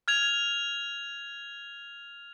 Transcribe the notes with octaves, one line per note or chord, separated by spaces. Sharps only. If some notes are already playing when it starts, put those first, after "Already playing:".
F6 G#6 F7